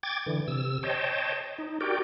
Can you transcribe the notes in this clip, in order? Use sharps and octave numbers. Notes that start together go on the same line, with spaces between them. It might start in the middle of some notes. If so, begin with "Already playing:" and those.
G5 D6 G#6 A6
D3 E3
C3 E6
C5 C#5 D#5 G5 A5
D#4
F#4 G4 A#4 D5 G5